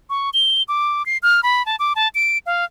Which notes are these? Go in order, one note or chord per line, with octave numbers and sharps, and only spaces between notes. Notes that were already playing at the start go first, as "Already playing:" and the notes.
C#6
G7
D6
C7
F6
B5
A5
D6
A5
D7
F5